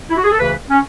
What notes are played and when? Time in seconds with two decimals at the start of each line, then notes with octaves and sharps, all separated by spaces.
0.10 E4
0.17 F#4
0.24 G#4
0.32 A4
0.39 D2 C#3 E3 B4
0.70 C#4